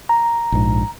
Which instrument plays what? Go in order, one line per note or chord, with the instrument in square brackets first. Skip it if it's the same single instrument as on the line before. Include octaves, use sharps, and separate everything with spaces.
[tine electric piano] A#5
[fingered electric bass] A#1 G#2